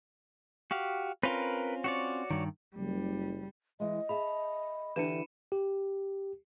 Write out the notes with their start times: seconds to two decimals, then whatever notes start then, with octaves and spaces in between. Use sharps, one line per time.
0.71 F#4 G4 F5
1.23 C4 C#4 F4 A#4 B4
1.84 F#4 C#5 D5
2.31 G2 D#3
2.76 F#1 G3
3.80 E3 G#3 D#5
4.09 G#4 E5 A5 B5
4.96 D3 E3 D4 G4 B4 C#7 D#7 E7
5.52 G4